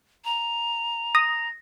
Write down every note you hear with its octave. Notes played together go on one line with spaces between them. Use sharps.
A#5
D#6 A#6